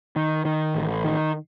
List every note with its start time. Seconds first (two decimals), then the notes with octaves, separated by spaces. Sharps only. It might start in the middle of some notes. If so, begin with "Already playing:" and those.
0.16 D#3
0.45 D#3
0.75 A1
1.04 D#3